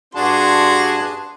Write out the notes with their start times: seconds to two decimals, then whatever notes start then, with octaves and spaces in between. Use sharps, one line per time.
0.15 G2 D4 F#4 G#4 A5 C6